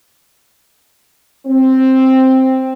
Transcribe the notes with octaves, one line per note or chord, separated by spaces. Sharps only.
C4